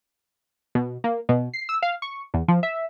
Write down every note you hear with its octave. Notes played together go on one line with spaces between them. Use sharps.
B2
A#3
B2
C7
E6
F5
C#6
E2
F3
E5